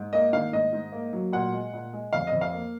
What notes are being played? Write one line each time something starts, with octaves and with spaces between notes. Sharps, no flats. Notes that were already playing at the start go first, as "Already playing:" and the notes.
Already playing: G#2
A#3 D#5
D#3 F5
G#2 D#5
G#2
A#3
F#3
A#2 F#5
G#3
A#2
G#3
F2 F5
D#5
F2
F5
A#3